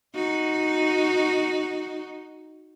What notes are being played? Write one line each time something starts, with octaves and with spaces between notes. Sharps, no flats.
D#4 F#4